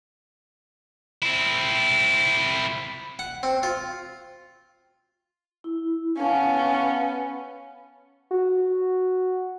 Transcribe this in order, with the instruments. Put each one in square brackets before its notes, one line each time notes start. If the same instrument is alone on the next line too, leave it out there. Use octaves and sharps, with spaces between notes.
[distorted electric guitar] C4 E4
[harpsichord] F#5
C4
F4
[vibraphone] E4
[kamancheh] B3 C#4 [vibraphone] F5 A5
[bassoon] F#4